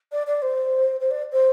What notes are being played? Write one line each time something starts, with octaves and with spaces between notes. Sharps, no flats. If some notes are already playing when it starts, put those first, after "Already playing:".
D5
D5
C5
C5
D5
C5